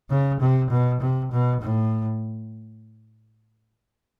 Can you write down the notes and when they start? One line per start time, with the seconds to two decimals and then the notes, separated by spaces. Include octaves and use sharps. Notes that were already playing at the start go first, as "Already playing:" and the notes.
0.10 C#3
0.41 C3
0.71 B2
1.01 C3
1.32 B2
1.62 A2